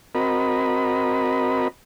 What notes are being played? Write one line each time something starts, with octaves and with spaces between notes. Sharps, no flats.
C4 F#4 A#4 D#5 B5